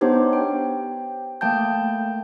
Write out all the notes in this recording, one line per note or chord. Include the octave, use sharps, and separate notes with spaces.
B3 D4 D#4 G4 C5 C#5
G5
A3 A#3 G5 A5 G6